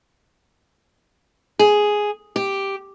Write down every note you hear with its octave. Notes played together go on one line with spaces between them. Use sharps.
G#4
G4